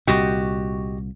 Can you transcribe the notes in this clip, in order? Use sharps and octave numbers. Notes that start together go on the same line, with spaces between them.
C2 A#2 F#4 G4 D#5